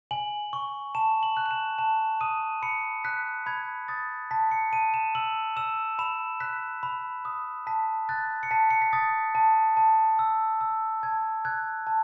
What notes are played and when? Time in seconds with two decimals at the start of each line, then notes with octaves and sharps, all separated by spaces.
0.11 G#5 F#7
0.53 C#6
0.95 A5 E7
1.23 F#7
1.37 F#6
1.46 F#7
1.51 E7
1.78 A5 E7
2.21 D#6 D#7
2.62 B5 C#7
3.04 F#6 B6
3.46 B5 G#6
3.88 D#6 A6
4.31 A5 B6
4.51 C#7
4.73 A5 D#7
4.94 E7
5.15 E6 F#7
5.57 E6 E7
5.99 B5 E7
6.40 F#6 B6
6.83 B5
7.25 D#6
7.67 A5 B6
8.09 F#6 A6
8.43 C#7
8.51 A5 B6
8.71 C#7
8.82 B6
8.93 D#6 A6
9.35 A5
9.77 A5
10.19 E6
10.61 E6
11.03 A5 G#6
11.45 F#6 G#6
11.87 A5